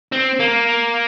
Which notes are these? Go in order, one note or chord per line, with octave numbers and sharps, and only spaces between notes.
C4
A#3